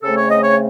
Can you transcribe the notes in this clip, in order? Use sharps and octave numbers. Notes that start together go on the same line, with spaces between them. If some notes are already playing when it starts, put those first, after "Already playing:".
C#3 A3 C4 A4
C#5
D#5
C#5